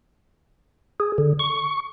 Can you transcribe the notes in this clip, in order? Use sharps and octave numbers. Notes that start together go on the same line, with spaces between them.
G#4
D3
C#6